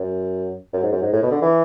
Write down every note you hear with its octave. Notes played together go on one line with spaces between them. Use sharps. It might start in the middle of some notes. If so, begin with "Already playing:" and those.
Already playing: F#2
F#2
G#2
F#2
G#2
A2
B2
D3
E3